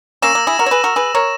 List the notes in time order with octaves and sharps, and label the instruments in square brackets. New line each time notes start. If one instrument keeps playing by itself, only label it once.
[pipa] A#3 C#4 [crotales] E6 A#6 E7
[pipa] A#3
E4 G#4
F#4 A#4
C#5
G#4 B4
F#4 A#4
G#4 B4
A#4 C#5